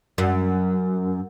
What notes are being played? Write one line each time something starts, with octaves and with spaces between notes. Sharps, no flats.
F#2